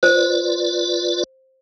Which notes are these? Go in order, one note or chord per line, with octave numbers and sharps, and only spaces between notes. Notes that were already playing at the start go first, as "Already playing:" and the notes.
F4 B4 C5 D5